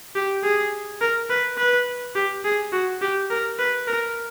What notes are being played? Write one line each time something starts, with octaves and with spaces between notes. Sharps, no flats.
G4
G#4
A#4
B4
B4
G4
G#4
F#4
G4
A#4
B4
A#4